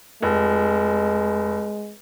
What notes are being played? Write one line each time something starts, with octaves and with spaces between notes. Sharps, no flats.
F1 G#3